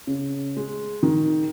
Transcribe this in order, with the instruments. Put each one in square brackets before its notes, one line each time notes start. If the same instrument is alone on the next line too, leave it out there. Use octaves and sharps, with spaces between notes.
[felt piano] C#3
G#3
D#3